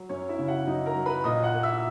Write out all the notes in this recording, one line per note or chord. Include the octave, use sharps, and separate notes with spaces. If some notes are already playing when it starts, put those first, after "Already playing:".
Already playing: F#3
F#2 C#4 C#5
E4 E5
C#3
F#4 F#5
F#2 D#4 D#5
A#4 A#5
F#3
B4 B5
A#2 D#5 D#6
F#5 F#6
A#3
E5 E6